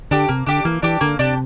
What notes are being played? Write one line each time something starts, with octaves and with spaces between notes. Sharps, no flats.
D3 D4 G4
C3 A#3
D3 D4 G4
E3 A#3
E3 D4 G4
D3 A#3
C3 D4 G4